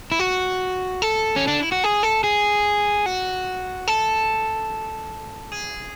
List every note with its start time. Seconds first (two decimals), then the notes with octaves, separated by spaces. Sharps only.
0.12 E4
0.20 F#4
1.02 A4
1.36 C#4
1.47 D4
1.60 E4
1.72 F#4
1.84 G#4
2.03 A4
2.24 G#4
3.06 F#4
3.88 A4
5.52 G#4